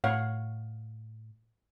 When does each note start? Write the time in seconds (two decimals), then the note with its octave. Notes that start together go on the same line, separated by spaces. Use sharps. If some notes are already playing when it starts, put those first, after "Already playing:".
0.04 A2 C#5 F5 F#5